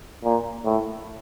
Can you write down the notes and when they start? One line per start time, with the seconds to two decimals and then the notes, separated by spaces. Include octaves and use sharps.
0.24 A#2
0.65 A2